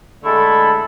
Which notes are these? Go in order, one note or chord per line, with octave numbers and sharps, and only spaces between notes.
D3 G#3 A3 E4 A4 B5